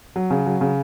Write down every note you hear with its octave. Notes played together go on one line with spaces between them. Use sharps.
F#3
C#3
F#3
C#3